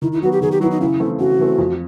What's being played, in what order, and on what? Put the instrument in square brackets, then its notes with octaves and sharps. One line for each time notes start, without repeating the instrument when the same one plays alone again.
[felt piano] D#3 [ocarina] E4
[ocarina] E4
[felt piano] F#3 B3 [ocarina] F#4
[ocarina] G4
[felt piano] D#3 [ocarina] G#4
[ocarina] G4
[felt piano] F#3 B3 [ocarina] E4
[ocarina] D#4
[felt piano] C#3 [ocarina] E4
[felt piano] E3 A3 C4
[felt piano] C#3 [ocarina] F#4
[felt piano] E3 A3 C4
F2